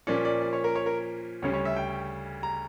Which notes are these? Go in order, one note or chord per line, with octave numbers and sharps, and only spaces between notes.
A#2 F3 A#3 C#4 D5
D5
D5
C#5
A#4
C#5
A#4
D2 C#3 G3 C#4 C#5
C#5
E5
G5
A#5